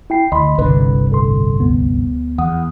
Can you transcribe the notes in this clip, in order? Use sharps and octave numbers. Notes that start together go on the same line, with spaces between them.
E4 G5 C7
D2 D#5 B5 C6
G1 C2 D3 B4
A2 A4 C6
D2 B3
E2 F#5 D#6